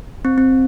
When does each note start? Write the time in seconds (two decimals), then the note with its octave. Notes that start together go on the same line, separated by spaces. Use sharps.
0.25 C4
0.38 C4